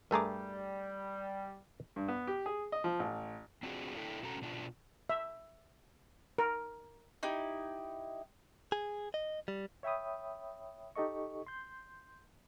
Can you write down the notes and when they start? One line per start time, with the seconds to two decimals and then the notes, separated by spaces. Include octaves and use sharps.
0.11 G2 G3 A3 G#4 A#4 A#5 D6
1.96 G2
2.08 B3
2.27 G4
2.46 G#4
2.72 D#5
2.84 F3
2.99 A1
3.63 C4 D4 F4 F#4 G#4 D5
3.96 D4 E4 A4 E5 G5
4.23 B2 C#4 F#4 A4 A#5
4.42 B2 D4 F4
5.10 E5
6.38 A#4
7.23 D#4 E4 G4
8.72 G#4
9.14 D#5
9.48 G3
9.83 C#5 E5 G5 B5 D#6
10.96 D#4 G4 A4 D#5 C#6
11.47 C6 G6